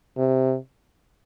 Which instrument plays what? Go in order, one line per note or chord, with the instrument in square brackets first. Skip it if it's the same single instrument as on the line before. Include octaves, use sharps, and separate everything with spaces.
[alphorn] C3